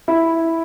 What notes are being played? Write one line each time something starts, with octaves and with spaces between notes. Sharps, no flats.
E4